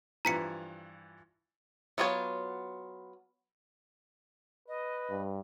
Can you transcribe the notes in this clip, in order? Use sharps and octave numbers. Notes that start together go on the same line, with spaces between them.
G2 E3 F3 A#5 B6 C#7
F#3 B3 F4 G#4 C#5
B4 D#5
G2